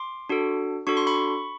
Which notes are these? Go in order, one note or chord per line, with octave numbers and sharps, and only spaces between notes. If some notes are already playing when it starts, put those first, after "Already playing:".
Already playing: C6 D6
D4 F#4 A4
D4 F#4 A4 C#6
C6
B5 C#6